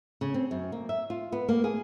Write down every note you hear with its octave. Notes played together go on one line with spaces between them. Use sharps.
C#3
C4
F#2
A#3
E5
F4
B3
A#3
G#4